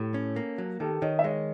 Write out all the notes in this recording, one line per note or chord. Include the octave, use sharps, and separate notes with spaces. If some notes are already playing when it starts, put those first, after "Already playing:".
Already playing: A2 G4 A4
C#4
A#3
F#3
D#3 G4 A4
D#3 C#5 D#5
E5
G#3 C#5 D#5